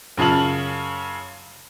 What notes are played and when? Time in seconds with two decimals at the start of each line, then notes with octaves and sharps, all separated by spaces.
0.17 F#2 C#3 F4 A5 F#7